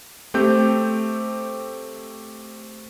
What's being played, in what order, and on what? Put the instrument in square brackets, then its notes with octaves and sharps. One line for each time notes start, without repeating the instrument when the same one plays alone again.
[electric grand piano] A3 C4 G4 G6